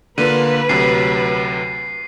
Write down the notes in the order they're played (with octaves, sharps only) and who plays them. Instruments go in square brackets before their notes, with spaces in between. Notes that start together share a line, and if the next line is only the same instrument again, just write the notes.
[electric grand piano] D3 A#3 F4 [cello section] B4 [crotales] D#7
[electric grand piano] D2 C3 F#3 [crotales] C7